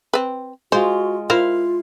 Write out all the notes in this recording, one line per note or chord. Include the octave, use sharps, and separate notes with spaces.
C4 B4
G#3 F4 F#4 C5
E4 F4 A#4 C5 F5